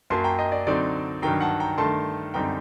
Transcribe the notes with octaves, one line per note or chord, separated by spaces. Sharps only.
F#2 F#3 A#3 A5 C6
G5 A#5
D#5 G5
D5
D3 F#3 C4 D#4 D5
G2 D#3 F#3 G5 A#5
F#5 A5
G5 A#5
G2 D#3 A3 A5 C6
F#2 D3 G3 C4 D#4 G5 A#5